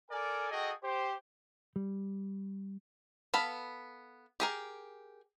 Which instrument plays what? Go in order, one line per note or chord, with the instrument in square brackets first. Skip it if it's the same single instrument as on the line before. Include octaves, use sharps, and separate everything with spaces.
[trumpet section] A4 A#4 D5 G#5
F#4 G#4 A4 D#5 G5
G4 C5
[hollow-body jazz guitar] G3
[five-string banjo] B3 A4 F5 B5
G4 G#4 A#4